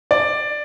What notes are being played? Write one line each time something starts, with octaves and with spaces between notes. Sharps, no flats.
D5